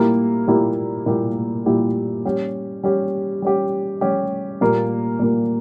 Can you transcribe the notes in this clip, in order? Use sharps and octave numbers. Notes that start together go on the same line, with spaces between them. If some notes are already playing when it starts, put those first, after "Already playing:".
Already playing: A#2 G3 A#3 E4 G4
A#2 G3 A#3 E4 G4
A#2 G3 A#3 E4 G4
A#2 G3 A#3 E4 G4
G3 C#4 G4
G3 C#4 G4
G3 C#4 G4
G3 C#4 G4
A#2 G3 A#3
A#2 G3 A#3